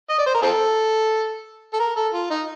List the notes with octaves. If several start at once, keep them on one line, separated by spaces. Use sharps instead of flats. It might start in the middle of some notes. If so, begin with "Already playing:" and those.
D#5
D5
C5
A#4
C4 F4 A4
A4
A#4
A4
F4
D#4